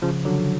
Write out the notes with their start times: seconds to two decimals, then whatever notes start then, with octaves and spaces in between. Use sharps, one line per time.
0.02 C#3 F3
0.25 D3 F#3